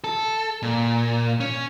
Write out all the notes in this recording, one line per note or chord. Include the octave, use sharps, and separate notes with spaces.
A4
A#2
C#4